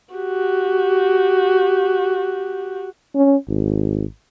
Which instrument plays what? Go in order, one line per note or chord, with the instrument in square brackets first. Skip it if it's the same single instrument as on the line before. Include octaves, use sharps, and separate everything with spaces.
[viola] F#4 G4
[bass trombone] C#4
G#1